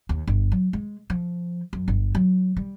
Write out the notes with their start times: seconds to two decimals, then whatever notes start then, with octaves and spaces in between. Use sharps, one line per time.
0.09 D#2
0.27 G1
0.52 F#3
0.73 G#3
1.10 F3
1.73 F#2
1.88 G1
2.15 F#3
2.57 G3